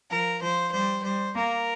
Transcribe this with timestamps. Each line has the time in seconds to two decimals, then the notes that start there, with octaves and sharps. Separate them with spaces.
0.11 F3 A#4
0.42 F3 C5
0.73 G3 C5
1.04 G3 C5
1.35 A#3 A#4